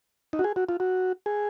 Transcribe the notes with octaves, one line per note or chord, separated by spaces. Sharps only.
D#4
F#4
G#4
F#4
F4
F#4
G#4